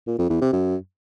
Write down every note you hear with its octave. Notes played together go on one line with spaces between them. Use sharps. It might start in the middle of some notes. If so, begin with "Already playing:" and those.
A#2
F2
E2
C3
F#2